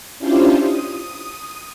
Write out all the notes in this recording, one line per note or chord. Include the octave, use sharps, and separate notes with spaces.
C#4 D4 E4 F4 G4 C5
D#6